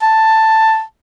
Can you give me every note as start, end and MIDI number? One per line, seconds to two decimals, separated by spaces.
0.02 0.82 81